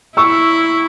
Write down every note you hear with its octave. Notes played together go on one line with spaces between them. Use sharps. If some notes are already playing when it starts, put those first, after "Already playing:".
E4 C#6 E6